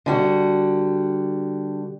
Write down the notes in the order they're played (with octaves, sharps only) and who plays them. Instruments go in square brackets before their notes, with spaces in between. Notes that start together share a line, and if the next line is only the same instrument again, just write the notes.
[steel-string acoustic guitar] D3 G3 F#4